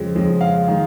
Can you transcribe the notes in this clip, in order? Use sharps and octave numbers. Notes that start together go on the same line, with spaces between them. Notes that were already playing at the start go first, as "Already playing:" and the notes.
Already playing: F2 C#3 G#3
F2 C#3 G#3
F5
D#3 G#3